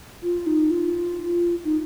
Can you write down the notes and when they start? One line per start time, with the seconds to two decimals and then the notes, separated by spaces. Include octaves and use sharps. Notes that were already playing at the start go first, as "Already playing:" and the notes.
0.23 F4
0.47 D#4
0.71 F4
1.64 D#4